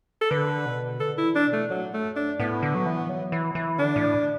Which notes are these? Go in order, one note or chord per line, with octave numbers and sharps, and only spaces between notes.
A4
D3 B4
B2
D3 A4
E4
E3
D4
B2
A3
A2 F#3
A3
F#2
D4
A2 B3
D3
F#3
E3
F#3
E3
E3
D3 D4
A2